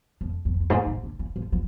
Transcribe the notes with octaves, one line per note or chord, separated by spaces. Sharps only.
F2
F2
F2
G#2
A2
D3
E3
F3
F3